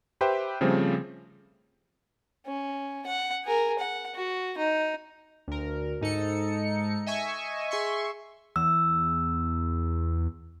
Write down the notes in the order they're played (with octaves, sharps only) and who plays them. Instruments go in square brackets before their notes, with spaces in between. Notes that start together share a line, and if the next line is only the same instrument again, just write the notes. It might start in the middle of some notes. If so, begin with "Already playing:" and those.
[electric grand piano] G4 B4 C5 E5 G5
C#3 F3 G3 A3 C4 C#4
[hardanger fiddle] C#4
F#5
G#4 A#4
F#5
F#4
D#4
[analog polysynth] D2 A#4
G#2 D#4 A4 C#7
D#5 E5 G#5 C#6
G#4 E5 C6 C#6
[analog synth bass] E2 [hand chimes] E6